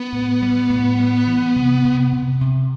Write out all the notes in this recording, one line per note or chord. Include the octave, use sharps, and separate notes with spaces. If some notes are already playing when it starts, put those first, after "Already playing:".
Already playing: B3
A2
G3
A2
G3
E3
C3
C3
C3
C3